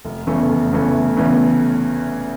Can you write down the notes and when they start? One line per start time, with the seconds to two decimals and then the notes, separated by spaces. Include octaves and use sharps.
0.05 F1
0.27 E2 C#3 E3 A3
0.50 F1
0.72 E2 C#3 E3 A3
0.94 F1
1.17 E2 C#3 E3 A3